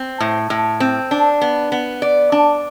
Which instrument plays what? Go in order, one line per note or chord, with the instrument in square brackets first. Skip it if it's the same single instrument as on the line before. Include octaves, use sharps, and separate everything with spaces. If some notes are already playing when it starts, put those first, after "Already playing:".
Already playing: [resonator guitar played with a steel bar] C4
A2
A2
C4
D4
B3
B3
D5
D4